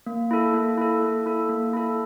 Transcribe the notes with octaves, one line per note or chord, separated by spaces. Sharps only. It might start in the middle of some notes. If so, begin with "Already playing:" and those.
A#3
E4 A4
A#3
E4 A4
A#3
E4 A4
A#3
E4 A4